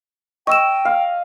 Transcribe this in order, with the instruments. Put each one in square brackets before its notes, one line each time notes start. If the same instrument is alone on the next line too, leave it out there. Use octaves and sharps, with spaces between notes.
[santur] D#5 [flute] G5 [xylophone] C#6 E6 E7
[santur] F5